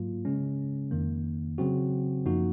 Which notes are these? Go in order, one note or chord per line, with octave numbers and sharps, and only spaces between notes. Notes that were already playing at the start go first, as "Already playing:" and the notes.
Already playing: G#2 F#3 A#3 F4
C#3 G#3 C#4
F2 D#3 A#3
C#3 F#3 C4 F#4
F#2 F3 A#3 D#4 F#4